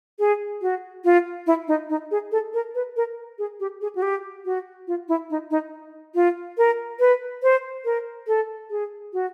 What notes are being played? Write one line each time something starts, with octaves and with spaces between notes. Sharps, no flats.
G#4
F#4
F4
E4
D#4
D#4
G#4
A4
A#4
B4
A#4
G#4
G4
G#4
F#4
G4
F#4
F4
E4
D#4
D#4
F4
A#4
B4
C5
A#4
A4
G#4
F#4